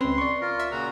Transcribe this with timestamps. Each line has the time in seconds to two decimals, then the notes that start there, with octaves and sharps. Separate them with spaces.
0.01 C#2 C4 C#4 B4 C6
0.18 D5 C#6
0.42 F4 A#4
0.60 E5
0.71 A#2 C#3 F#4 A#5